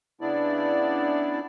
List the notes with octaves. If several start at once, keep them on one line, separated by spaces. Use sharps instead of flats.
C#3 B3 D4 E4 D5